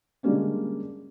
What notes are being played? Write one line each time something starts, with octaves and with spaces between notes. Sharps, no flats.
D3 G3 G#3 A#3 C#4 D4